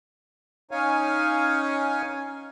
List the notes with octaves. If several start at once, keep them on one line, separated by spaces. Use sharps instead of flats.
C#4 D#4 C#5 F5 G#5